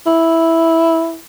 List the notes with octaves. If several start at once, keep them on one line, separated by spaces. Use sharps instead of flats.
E4